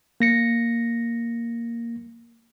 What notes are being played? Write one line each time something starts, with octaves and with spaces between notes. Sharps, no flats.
A#3 A#6 C#7